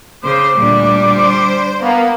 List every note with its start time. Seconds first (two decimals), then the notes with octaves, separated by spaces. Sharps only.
0.24 C#3 C5 D6
0.57 D2 A#2 G3 D4
1.18 C5
1.82 A#3 B3